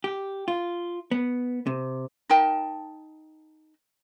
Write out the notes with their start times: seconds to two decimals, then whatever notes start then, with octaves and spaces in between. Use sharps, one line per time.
0.04 G4
0.48 F4
1.11 B3
1.67 C3
2.29 D#4 A#4 G5 A5